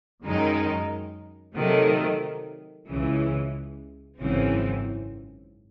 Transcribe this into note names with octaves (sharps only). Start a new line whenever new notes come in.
F#2 D#3 G#3 D#4
C3 D#3 F#3 A3
C#2 C#3 E3
G#1 F#2 C#3 E3 C4